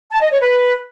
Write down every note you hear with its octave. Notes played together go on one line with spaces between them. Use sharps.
A5
D#5
C#5
B4